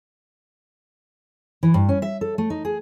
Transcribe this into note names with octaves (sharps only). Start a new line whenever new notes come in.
E3
G2
C#4
E5
A4
A3
D#4
G#4